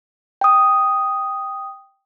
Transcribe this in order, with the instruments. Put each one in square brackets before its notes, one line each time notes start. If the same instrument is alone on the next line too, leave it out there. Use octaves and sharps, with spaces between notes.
[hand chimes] G5 D#6